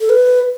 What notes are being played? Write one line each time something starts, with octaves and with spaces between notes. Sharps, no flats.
A4
B4